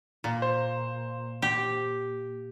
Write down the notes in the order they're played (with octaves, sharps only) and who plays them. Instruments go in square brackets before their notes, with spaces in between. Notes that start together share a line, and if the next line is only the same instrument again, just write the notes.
[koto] A#2
[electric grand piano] C5
[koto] G4